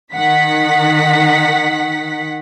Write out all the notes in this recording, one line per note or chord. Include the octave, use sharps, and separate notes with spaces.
D#3 F#5 B6